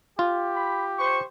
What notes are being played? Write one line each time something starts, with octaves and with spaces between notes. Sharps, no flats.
F4 G4
B5
C5 C#6